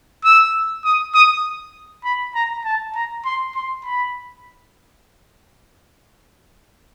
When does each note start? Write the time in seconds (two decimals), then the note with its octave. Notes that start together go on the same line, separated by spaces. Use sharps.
0.25 E6
0.85 D#6
1.14 D#6
2.05 B5
2.35 A#5
2.65 A5
2.96 A#5
3.25 C6
3.55 C6
3.85 B5